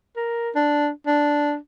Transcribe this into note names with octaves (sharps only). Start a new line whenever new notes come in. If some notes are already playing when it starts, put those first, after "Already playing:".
A#4
D4
D4